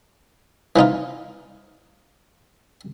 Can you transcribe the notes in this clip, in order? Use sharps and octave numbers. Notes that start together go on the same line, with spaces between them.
E3 F3 D#4 F4